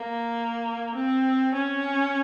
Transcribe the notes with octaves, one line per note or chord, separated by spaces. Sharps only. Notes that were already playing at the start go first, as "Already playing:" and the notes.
Already playing: A#3
C4
C#4